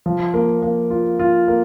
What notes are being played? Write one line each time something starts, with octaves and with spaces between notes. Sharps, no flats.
F3
A#3
A#3
F4
F4
A#3